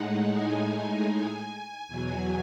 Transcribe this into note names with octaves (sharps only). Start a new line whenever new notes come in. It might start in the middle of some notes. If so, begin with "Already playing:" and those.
Already playing: A2 G#3 D#4 F#5
G#5
G#5
E2 B2 F#3